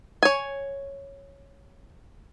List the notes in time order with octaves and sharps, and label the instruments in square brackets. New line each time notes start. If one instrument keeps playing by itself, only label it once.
[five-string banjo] C#5 G#5